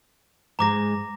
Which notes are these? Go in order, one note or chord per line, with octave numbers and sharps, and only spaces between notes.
G#2 G#3 G#4 A#5 D6 A#6